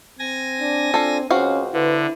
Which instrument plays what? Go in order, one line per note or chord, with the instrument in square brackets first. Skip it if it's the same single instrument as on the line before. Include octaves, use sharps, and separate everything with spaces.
[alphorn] C4 [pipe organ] G#5 A#6
[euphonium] D4
[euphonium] D4 [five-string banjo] F4 A4
[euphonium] C#2 [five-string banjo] C4 F#4 F5 [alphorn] C#4
[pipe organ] D3 [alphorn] E4 [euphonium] B4